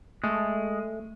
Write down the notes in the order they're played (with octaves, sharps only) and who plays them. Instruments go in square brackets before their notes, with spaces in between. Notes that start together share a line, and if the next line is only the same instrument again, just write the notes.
[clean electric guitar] G#3 [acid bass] A3